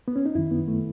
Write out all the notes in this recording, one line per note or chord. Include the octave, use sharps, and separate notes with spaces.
B3
C#4
D#4
F#2 D#3 E4
B3
A3